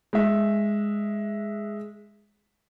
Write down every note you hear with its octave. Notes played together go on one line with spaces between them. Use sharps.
G#3 E5